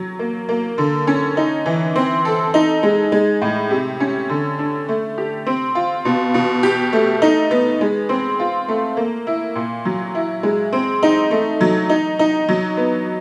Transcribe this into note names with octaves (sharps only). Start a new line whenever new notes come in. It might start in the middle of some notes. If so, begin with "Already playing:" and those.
Already playing: F#3
A#3
A#3
D3
C#4
D#4
E3
C4
A4
D#4
G#3
G#3
A2
C3
C#4
D3
D4
A3
G4
C4
F4
B2
B2
G4
A3
D#4
B3
G#3
C4
F4
A3
A#3
E4
A#2
F#3
E4
G#3
C4
D#4
A3
F#3
D#4
D#4
F#3
B3